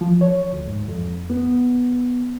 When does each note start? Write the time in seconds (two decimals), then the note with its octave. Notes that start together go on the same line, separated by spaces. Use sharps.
0.01 F3
0.21 C#5
0.53 D2
0.67 G#2
0.88 F2
1.30 B3